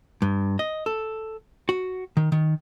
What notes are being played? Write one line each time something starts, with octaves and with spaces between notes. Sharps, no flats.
G2
D#5
A4
F#4
D#3
D#3